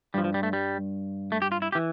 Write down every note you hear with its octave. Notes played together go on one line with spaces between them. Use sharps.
G2 F3 G3
F3
G3
A3
G3
A3
G4
F4
E4
G4
E3